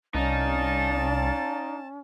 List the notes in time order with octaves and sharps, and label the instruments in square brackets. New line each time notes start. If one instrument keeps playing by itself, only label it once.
[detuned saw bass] C2 [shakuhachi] C#4 [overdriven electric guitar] D#4 [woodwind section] D5 F5 A5